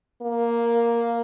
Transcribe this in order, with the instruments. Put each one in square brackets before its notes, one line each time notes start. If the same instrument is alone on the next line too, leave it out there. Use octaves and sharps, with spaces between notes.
[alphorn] A#3